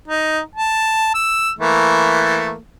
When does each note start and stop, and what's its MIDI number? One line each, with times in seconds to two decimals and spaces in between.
0.08 0.40 63
0.55 1.12 81
1.14 1.50 88
1.59 2.56 52
1.59 2.56 57
1.59 2.56 58